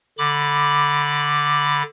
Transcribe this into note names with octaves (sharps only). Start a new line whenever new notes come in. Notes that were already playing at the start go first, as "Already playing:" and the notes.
D3 B5 D6